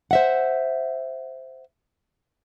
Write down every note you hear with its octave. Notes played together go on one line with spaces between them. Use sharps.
C5 E5 F#5